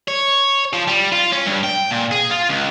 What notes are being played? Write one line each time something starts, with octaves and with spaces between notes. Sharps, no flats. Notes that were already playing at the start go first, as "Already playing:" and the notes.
C#5
F3
G3
F4
C#4
G2
G5
A#2
G#4
F4
C#2